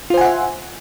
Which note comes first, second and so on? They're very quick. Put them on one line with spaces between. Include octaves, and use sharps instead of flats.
F4 C5 G#5 F#5 E5